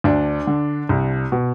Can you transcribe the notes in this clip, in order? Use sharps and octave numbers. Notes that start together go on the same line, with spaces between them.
D2 D4
D3
C2
B2